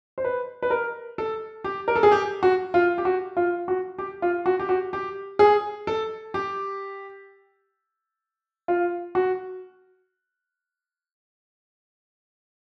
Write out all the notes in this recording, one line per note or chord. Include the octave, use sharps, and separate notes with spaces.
C5
B4
B4
A#4
A4
G4
A#4
A4
G#4
G4
F#4
F4
G4
F#4
F4
F#4
G4
F4
F#4
G4
F#4
G4
G#4
A4
G4
F4
F#4